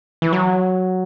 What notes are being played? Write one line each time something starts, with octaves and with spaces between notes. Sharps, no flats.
E3
F#3